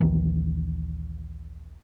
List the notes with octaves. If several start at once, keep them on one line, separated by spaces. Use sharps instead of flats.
A#1 D#2 D#3 E3